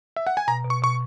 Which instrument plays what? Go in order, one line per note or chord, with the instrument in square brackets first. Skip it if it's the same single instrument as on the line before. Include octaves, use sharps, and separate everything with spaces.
[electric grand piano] E5
F#5
G#5
[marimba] B2 [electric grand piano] A#5
[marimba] B2
[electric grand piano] C#6
[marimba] B2 [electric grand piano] C#6